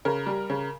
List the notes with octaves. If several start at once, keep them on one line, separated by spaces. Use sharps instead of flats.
C#3 A#4
G3
C#3